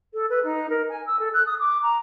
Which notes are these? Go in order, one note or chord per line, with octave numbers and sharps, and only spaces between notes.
A4
B4
D#4
A#4
G#5
E6
A4
F#6
D#6
D6
A#5